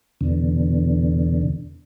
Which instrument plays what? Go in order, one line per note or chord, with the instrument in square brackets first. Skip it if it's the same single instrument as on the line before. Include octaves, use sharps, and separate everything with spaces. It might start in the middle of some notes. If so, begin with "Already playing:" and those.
[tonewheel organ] E2 B2 D3